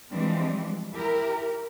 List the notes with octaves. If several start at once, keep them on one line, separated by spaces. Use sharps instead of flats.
E3 F3 G3 G#3 C4 D4
E4 G4 A#4